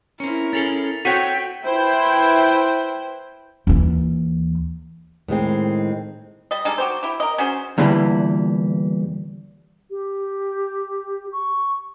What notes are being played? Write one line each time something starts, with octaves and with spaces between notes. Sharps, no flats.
C4 C#4 E4 A#4
C#4 G#4 A4 A6 F7
C4 F#4 A4 C#5 G5 B6 D#7 G7
E4 B4 C5 G5
D#2 E3
A2 D#3 G#3 C4
G3 D#5
G3 G#3 D#4 A4
F#4 G4 C5
E4 G4
A#4 D#5
C#4 F#4 G#4 C5
E2 A#2 D3 E3 G3
G4
C#6